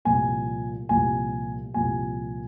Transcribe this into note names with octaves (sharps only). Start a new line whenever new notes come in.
C2 A#2 F3 G#5
C2 A#2 F3 G#5
C2 A#2 F3 G#5